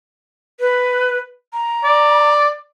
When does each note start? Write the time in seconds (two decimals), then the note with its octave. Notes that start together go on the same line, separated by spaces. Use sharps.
0.60 B4
1.53 A#5
1.84 D5